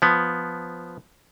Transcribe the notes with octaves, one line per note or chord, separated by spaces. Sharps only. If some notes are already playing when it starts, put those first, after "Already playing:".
F3 B3